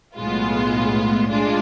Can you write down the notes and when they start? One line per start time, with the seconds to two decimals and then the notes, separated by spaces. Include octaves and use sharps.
0.16 B1 A2 G#3 B3 F4
1.30 G#3 D4 F4